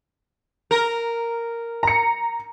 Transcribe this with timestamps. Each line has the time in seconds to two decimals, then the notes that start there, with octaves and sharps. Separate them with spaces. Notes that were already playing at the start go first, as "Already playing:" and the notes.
0.71 A#4
1.83 A#5 C#7